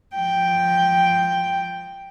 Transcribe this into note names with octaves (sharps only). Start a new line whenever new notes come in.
F3 G5